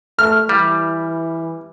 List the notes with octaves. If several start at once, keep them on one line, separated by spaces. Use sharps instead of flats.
A3 F6
E3 G3